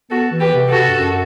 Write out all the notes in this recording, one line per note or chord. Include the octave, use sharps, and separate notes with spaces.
B3 F#4 A4
E3
G4 B4
C3
F#4 A4
C3
G2
F#2